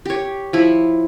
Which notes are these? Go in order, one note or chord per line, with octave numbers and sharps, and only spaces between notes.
G4 C#5
F3 E4